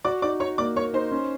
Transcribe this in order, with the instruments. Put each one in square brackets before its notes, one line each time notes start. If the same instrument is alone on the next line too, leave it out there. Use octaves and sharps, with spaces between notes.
[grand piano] F#4 [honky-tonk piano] D5 D6
[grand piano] D#4 [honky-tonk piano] D5 D6
[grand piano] D#4 [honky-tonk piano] C#5 C#6
[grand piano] A#3 [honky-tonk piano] D5 D6
[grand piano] A#3 [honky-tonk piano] C#5 C#6
[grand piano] D#4 [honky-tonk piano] C5 C6
[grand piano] C#4